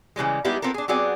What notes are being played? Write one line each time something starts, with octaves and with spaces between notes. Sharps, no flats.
C#3 E3 G3 G#3
G3 G#3 B3 D#4 E4 G4
B3 C4 F4 A4 A#4
D4 G#4
F#3 B3 C4 F#4 G#4 D5